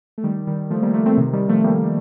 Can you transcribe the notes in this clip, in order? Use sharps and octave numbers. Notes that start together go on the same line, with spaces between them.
A3
D#3 G3
D#3 G3
F3 A3
G3 A#3
F3 A3
A3 C4
C3 D#3
D#3 G3
F3 A3
G3 A#3